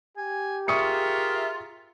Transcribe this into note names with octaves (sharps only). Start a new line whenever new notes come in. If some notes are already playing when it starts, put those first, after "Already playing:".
G4 G#5
F4 G#4 A#4 E5 C#6 D#6 C#7